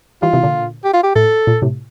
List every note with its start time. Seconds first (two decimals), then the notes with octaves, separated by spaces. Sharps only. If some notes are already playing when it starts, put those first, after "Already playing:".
0.22 E3 G3 F4
0.33 C3 E3
0.43 A#2 D3
0.84 G4
0.94 F4
1.03 G4
1.16 A2 A4
1.47 A#2
1.62 A2 C3